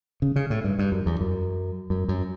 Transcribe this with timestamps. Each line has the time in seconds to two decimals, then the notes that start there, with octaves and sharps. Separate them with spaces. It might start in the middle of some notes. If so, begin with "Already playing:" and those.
0.22 C#3
0.36 C#3
0.50 A2
0.64 G2
0.79 G2
0.92 F#2
1.06 E2
1.21 F#2
1.90 F#2
2.08 F#2